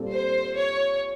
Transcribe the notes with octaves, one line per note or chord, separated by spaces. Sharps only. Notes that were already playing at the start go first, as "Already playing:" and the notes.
Already playing: A#2 G3 C4 F4 A4
C5
C#5